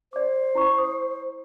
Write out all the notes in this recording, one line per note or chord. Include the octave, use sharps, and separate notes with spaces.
C5 D5 D6
E4 A#5 C#6
D#6